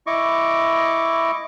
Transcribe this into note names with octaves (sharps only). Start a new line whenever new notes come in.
E4 D#5 C#6 D6